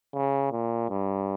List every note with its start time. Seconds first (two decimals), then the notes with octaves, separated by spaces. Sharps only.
0.14 C#3
0.52 A#2
0.90 G2